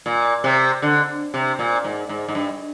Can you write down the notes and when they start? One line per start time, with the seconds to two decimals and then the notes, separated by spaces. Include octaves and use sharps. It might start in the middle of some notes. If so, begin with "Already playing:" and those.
0.06 A#2
0.44 C3
0.82 D3
1.34 C3
1.59 A#2
1.84 G#2
2.09 G#2
2.29 G#2
2.35 G2